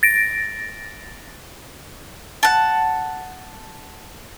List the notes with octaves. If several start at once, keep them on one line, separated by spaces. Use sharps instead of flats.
A6 A#6 D7
F#5 A5